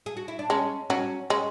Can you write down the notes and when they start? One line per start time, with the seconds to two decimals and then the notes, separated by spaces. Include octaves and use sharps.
0.06 G#4
0.17 F#4
0.28 E4
0.39 D4
0.50 G#3 C#4
0.90 F#3 C#4
1.30 G#3 C#4